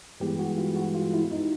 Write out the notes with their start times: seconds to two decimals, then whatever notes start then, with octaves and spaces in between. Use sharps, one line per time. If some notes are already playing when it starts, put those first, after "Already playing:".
0.20 G2 E3 G#3 B3 G4
0.39 F#4
0.58 F4
0.76 F#4
0.94 F4
1.14 E4
1.31 D#4